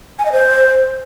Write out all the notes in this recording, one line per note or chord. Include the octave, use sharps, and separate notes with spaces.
G#5
D#5
C5